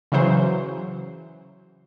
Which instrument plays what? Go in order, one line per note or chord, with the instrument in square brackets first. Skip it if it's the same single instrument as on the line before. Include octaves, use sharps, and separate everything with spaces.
[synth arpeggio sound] C#3 E3 F#3 C5